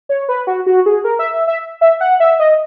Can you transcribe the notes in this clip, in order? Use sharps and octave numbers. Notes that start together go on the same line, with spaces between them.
C#5
B4
F#4
F#4
G#4
A#4
E5
E5
E5
E5
F#5
E5
D#5